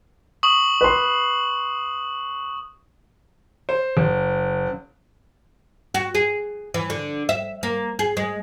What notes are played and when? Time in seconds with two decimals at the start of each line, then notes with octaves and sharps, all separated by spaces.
0.43 C#6 D#6 F#7
0.81 B4 C6
3.69 C5
3.97 F#1
5.94 F#4
6.15 G#4
6.74 E3
6.90 D3
7.29 E5
7.63 A#3
7.99 G#4
8.17 G#3